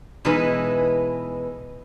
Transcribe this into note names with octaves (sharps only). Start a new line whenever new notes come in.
B2 E3 G#3 D#4 E4 B4